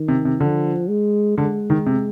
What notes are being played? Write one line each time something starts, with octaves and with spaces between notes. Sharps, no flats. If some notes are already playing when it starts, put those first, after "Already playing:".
Already playing: D#3
C3
C3
D3 F3
G#3
D3 G#3
D#3
C3